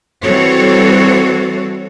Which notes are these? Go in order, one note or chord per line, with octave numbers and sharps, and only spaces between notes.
E3 G3 C4 F#4 A4 C#5